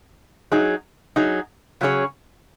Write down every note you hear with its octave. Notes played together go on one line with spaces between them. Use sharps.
F#3 D#4 G#4
F#3 D#4 G#4
C#3 F#3 C#4 G#4 C#5